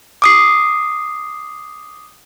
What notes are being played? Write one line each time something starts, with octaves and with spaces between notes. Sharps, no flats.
D6 D#6 C7